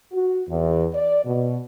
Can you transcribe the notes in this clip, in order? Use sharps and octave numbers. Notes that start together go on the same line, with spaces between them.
F#4
E2
D5
B2